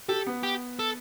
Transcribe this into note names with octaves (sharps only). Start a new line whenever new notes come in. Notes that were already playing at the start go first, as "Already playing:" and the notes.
G4 A4
B3
G4
A4